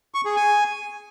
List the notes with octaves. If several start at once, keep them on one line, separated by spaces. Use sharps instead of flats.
C#6
G#4
G#5